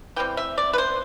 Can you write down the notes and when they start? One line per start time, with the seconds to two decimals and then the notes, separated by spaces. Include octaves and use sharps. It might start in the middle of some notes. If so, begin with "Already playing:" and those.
0.16 E3 G3 C4 G5
0.37 E5
0.58 D5
0.73 B4
0.78 C5